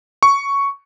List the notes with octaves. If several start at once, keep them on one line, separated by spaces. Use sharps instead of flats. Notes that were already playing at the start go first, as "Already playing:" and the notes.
C#6